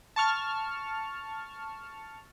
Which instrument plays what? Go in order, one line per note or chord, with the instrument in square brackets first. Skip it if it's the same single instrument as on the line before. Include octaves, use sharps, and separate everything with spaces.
[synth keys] A5 C#6 F6